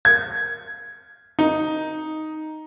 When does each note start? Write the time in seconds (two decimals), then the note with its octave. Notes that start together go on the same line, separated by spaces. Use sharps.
0.05 G#6
1.39 D#4